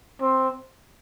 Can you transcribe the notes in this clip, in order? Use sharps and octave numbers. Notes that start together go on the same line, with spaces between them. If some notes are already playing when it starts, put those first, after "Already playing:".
C4